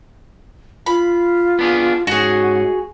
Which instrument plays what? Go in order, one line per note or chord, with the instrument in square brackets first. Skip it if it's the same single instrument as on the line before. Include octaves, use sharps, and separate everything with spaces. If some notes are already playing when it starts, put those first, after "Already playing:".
[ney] F4 [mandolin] B5
[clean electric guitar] B3 D4 G#4
[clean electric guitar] G#2 C#4 [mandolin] F#4 G#4 [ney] F#5